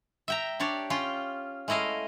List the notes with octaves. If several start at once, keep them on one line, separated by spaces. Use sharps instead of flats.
E5 G5 A#5
D4 G4 C#5 D5
C#4 F4 G5
G#3 A3 E4 D#5 F5